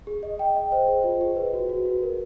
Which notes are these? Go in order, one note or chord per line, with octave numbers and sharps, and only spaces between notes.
G#4
D#5
G5
D#5
C5
G#4
F4
G#4
B4
F#4
F#4
F#4
A#4